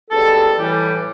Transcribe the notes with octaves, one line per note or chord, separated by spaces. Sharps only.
C#2 B2 G3 A4
A2 E3 G3